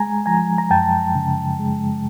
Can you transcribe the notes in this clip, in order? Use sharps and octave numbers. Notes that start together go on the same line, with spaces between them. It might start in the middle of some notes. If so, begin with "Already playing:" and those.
Already playing: G#3 G#5 A#5
F3 G#5 A#5
A#5
F#2 G5 A5
C#3
G#3